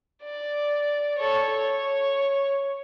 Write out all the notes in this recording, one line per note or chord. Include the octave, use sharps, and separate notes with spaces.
D5
A4 C#5
C#5